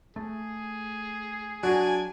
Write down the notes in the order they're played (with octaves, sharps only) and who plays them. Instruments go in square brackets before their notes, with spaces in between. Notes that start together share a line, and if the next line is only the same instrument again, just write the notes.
[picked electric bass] A3 [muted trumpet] G#4
[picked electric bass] F#3 [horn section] D4 G#5 [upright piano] F#4